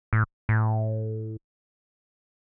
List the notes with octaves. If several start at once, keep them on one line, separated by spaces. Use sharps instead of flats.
A2
A2